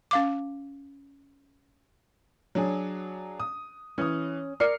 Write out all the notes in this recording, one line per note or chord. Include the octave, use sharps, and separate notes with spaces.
C#4 F5 D6
F#3 D4 G#4
D#6
E3 C#4 D#6
A#4 D5 F6 C7 C#7